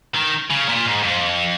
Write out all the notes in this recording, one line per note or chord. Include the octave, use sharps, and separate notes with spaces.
D#3
C#3
A#2
G#2
F2